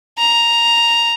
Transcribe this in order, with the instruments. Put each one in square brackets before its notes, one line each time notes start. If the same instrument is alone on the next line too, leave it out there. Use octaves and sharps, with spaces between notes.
[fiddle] A#5